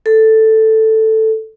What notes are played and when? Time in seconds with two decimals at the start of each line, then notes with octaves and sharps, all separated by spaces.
0.06 A4